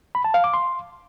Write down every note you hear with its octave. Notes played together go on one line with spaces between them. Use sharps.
B5
A5
F5
D6
C6